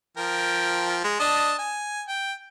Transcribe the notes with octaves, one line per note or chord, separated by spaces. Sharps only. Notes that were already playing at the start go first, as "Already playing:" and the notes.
F3 A#4 G5
G#3
D4 D#5 A5
G#5
G5